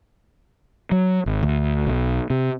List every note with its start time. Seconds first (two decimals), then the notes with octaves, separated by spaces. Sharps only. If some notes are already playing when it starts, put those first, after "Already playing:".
0.92 F#3
1.26 G#1
1.43 D2
1.87 B1
2.30 C3